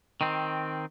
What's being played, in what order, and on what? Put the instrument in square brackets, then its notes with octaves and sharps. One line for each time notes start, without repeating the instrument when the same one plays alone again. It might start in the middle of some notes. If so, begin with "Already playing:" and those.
[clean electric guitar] D#3 C4